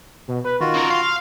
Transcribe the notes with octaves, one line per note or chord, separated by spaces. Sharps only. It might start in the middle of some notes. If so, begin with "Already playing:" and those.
B2
B4
D#3 F4 F#4
C#3 A#4
F5 C6